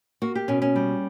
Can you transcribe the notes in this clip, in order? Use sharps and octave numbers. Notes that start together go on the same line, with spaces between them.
A#3 F#4
G4
B2 C#4
C#4
G3